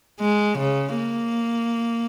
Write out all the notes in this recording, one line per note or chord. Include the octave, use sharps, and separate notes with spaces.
G#3
C#3
A#3